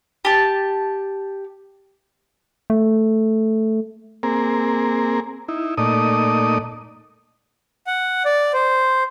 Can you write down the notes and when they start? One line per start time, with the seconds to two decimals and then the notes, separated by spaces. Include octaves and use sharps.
0.25 G4 A5
2.70 A3
4.23 A#3 C4 G#4 A#4
5.48 D#4 E4
5.78 A#2 A3 D#4 D5 D#5 D#6
7.87 F#5
8.25 D5
8.54 C5